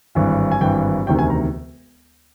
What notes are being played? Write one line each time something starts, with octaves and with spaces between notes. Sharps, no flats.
G#1 G2 E3
G#5
G#1 G2 E3 G5
E1 D2 C3 D#3 G5
G#5
A#5